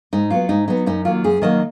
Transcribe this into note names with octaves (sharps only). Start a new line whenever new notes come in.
G#2 D#4
F#3 B3 F4
G#2 D#4
F#3 B3 D#4
F#2 D#4
D#3 F#3 A#3 F4
F#2 G#4
D#3 F#3 A#3 D#5